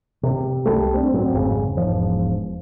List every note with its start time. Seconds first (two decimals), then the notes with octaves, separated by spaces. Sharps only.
0.23 C3
0.65 C2 G3 A3
0.94 C4 D4
1.13 A2 F#3 B3 C4
1.32 G#1 F2 C#3
1.77 E1 G#2 F3